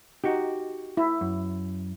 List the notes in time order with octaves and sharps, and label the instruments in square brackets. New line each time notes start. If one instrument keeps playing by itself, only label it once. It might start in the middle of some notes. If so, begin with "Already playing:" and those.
[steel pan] D#4 [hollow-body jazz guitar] F#4 G4
[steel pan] E4
[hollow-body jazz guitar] F#2